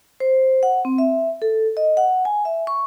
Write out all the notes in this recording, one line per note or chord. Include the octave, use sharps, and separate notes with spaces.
C5
F#5
C4
E5
A4
D#5
F#5
G#5
E5
C#6